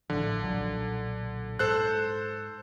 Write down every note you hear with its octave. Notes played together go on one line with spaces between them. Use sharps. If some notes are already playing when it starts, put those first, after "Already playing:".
G#1 A2 D3 F3
B1 A#2 F#3
G#2 A4 C5 F#6